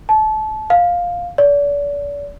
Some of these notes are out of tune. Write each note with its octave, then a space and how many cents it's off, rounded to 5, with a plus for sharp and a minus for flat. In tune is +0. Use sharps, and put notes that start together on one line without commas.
A5 -30
F5 +10
D5 -40